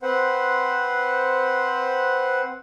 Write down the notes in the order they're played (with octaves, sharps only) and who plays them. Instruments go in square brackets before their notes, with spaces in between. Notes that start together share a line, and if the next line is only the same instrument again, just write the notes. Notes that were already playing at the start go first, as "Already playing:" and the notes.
[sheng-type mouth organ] C4 B4 C5 F#5